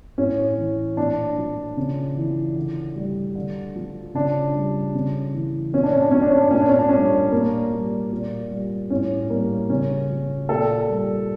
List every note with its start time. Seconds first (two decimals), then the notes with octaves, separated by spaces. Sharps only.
0.18 A2 C#4
0.58 E3
0.97 A#2 D4
1.38 F3
1.77 C#3
2.17 E3
2.56 D3
2.96 G3
3.35 D3
3.75 F3
4.14 C#3 D4
4.55 G3
4.95 C#3
5.34 E3
5.73 A#2 C#4
5.83 D4
5.92 C#4
6.02 D4
6.11 F3 C#4
6.22 D4
6.30 C#4
6.41 D4
6.51 A#2 C#4
6.59 D4
6.69 C#4
6.79 D4
6.89 G3 C#4
7.32 A#2 A#3
7.73 G3
8.12 A#2
8.51 G3
8.90 A2 C#4
9.30 G3 A#3
9.70 C#3 C#4
10.10 F3
10.49 A#2 A4
10.89 G3